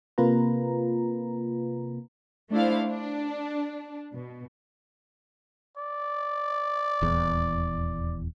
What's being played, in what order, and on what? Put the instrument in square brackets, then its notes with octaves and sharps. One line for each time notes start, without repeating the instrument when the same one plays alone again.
[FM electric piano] C3 A#3 F4 B4 A#5
[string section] A3 D4 E4 C5 F5
D4
B2
[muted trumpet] D5
[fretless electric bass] D#1 E2